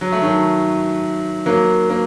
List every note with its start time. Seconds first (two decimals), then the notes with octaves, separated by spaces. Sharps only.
0.01 F#3
0.12 A3
0.22 D#3 F#3
1.46 F#3 A#3
1.90 A#3